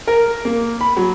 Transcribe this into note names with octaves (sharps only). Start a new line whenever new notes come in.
A#4
A#3
B5
F#3